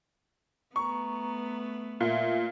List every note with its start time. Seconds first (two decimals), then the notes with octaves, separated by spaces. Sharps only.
0.76 A3 B3 A#5 C#6
2.01 A#2 E5